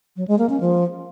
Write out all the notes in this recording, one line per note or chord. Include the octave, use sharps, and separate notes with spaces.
F#3
G#3
A#3
C#4
F3